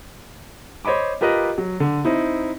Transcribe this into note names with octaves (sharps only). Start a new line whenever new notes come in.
C5 C#5 D#5 B5 D6
F4 G4 A#4 B4 D#5
F#3
D3
C4 D#4 E4